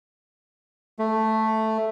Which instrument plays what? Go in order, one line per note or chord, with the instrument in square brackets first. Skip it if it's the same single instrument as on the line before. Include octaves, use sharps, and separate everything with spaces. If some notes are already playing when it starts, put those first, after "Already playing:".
[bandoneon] A3